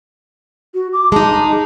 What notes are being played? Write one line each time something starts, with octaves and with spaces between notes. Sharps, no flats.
F#4
D6
G#3 D#4 A5